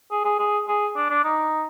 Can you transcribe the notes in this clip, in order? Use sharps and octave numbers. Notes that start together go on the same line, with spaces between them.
G#4
G#4
G#4
G#4
D4
D4
D#4